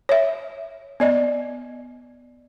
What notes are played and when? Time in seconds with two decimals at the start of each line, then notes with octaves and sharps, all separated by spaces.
0.09 C#5 E5
1.00 B3 D5 D#5